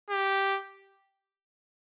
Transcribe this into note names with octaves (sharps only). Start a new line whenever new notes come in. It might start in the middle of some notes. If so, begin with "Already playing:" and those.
G4